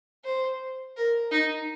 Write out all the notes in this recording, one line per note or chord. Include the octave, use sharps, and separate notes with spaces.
C5
A#4
D#4